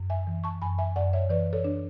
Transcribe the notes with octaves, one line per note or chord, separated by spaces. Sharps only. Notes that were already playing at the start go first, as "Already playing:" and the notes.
Already playing: F#2
E5 G#5
E3
A5 C#6
F#2 G#5 B5
E5 G#5
F#2 D5 F#5
C#5 E5
E3 B4 D5
A4 C#5
D4